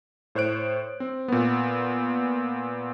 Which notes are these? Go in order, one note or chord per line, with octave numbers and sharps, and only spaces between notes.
A2 C5 C#5 F#6 D7
C4
A#2 B3